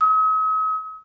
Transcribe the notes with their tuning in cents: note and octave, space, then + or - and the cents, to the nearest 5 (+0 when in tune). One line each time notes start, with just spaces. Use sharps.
D#6 +45